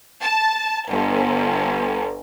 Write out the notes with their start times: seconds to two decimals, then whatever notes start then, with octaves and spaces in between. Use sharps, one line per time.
0.23 A5
0.90 G1